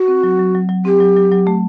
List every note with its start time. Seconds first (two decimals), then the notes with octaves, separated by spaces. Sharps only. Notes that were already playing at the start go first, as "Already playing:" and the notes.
Already playing: F#4
0.08 C4
0.23 F#3
0.39 F#3
0.55 F#3
0.69 F#3
0.85 C4 G4
1.01 F#3
1.16 F#3
1.32 F#3
1.47 A3